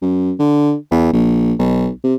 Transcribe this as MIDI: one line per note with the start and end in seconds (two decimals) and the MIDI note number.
0.02 0.33 42
0.40 0.75 50
0.91 1.11 40
1.13 1.53 34
1.59 1.89 35
2.04 2.15 48